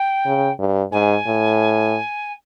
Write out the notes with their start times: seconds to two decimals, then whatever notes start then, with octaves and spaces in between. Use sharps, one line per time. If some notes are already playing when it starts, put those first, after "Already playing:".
Already playing: G5
0.26 C#3
0.59 G2
0.92 G#2 G#5
1.26 A2